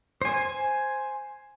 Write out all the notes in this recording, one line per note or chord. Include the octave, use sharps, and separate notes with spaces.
C5 G#5